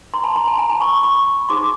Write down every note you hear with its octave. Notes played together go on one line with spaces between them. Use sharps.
A#5 C6
A5 B5
A#5 C6
A5 B5
G#5 A#5
A5 B5
B5 C#6
B5 C#6
D#4 G#4 C5 C6 D6